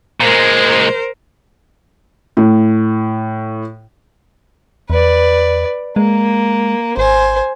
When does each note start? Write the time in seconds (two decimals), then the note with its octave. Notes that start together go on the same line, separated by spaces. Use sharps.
0.21 A#2 G#3 A#4 C5
2.37 A2
4.90 E2 B4 D5
5.96 G#3 A#3
6.97 G#1 C5 G#5